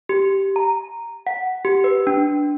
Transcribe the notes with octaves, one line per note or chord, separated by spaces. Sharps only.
G4
A#5
F#5
G4
B4
D4